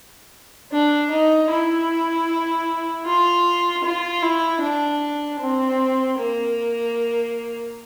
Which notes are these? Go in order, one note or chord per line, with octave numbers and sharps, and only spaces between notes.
D4
D#4
E4
F4
F4
E4
D4
C4
A#3